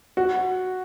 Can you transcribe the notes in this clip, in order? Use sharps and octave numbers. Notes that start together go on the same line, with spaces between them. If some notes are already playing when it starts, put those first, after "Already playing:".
F#4